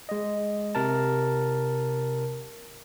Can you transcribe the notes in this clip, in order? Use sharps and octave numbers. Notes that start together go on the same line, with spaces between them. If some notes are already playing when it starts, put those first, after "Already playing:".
G#3 D#5
C3 A#4 A5